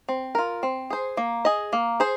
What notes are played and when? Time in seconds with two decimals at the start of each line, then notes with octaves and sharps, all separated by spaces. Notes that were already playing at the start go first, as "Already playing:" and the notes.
0.09 C4
0.35 F4 A#4
0.63 C4
0.90 G#4 C5
1.17 A#3
1.45 G#4 D#5
1.73 A#3
2.00 G#4 C5